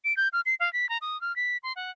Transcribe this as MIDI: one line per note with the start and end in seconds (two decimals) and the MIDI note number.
0.05 0.16 98
0.17 0.28 91
0.33 0.41 89
0.46 0.55 96
0.60 0.72 77
0.73 0.89 95
0.89 0.98 82
1.01 1.20 87
1.21 1.35 89
1.36 1.57 95
1.63 1.73 84
1.76 1.91 78